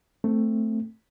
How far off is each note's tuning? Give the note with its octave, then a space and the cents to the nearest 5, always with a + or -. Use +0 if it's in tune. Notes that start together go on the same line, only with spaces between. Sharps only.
A3 +10 C4 +0